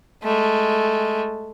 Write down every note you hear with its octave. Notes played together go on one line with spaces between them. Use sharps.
G#3 A3